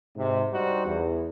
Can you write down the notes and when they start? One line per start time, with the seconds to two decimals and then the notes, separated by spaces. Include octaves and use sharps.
0.17 G#2 C3
0.52 G2 G3 D#4 F#4 C5
0.85 E2